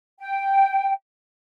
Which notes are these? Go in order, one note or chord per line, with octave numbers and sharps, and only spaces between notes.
G5